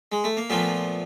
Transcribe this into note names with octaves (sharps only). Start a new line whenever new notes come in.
G#3
A3
A#3
A#2 F3 A3 B3